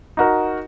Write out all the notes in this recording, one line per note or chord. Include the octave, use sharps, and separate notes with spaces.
D#4 F#4 A#4